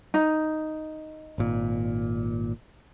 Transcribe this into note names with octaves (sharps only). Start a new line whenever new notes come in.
D#4
G#1 A#2